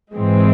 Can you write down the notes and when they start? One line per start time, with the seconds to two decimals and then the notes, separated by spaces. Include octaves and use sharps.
0.14 G#2 E3 G#3 C4